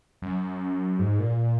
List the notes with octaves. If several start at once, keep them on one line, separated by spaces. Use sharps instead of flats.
F#2
G#2
A#2